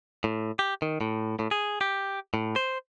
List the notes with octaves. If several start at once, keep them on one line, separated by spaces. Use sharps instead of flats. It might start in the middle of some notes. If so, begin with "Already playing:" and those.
A2
G4
D#3
A2
A2
G#4
G4
A2
C5